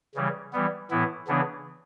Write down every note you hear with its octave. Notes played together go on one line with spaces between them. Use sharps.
C#3 E3 G3
E3 G3 B3
A2 E3 B3 E4
C#3 E3 B3 D4